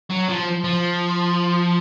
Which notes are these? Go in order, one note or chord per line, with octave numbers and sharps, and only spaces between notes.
F#3
F3
F3